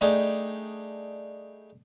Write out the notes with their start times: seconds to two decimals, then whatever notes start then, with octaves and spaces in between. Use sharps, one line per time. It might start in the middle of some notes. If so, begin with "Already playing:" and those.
0.01 G3 A3 D4 D#4 G4 G#4